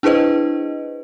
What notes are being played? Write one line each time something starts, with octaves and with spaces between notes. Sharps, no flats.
D4 E4 G#4 B4 C5 D#5